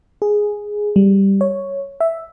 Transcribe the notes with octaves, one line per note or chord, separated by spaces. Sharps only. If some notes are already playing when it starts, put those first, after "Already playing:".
G#4
G3
C#5
E5